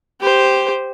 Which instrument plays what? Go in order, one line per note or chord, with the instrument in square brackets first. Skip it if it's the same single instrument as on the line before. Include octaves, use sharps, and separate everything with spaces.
[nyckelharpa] G4 C5